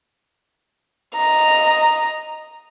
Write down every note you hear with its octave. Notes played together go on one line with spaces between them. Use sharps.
D#5 A#5